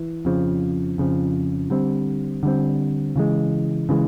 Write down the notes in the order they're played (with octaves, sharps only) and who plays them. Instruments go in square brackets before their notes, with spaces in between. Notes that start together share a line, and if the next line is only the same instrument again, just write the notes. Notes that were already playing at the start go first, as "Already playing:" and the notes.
Already playing: [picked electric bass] E3
F2 C#3 F3
F2 C#3 F3
D3 G3 C4
D3 G3 C4
C#3 E3 G#3
C#3 E3 G#3